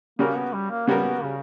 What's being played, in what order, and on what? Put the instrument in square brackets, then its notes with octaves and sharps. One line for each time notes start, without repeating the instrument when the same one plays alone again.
[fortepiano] C#3 G3 C#4 F#4 A#4 [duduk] A#3
[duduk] B3
G3
A#3
[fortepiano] C#3 G3 C#4 F#4 A#4 [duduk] B3
[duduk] C#3